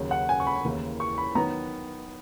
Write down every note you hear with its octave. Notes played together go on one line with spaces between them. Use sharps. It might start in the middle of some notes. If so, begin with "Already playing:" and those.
Already playing: D#2 C#3 F#3
F#5
G#5
C#6
B5
D#2 C#3 E3 A#3 E4
C#6
B5
D#3 F#3 B3 A#5